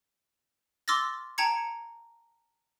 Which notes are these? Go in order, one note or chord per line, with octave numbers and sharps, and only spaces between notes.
C6 D6 E6 F6 A6 A#6
G5 A5 A#5 G#6 C#7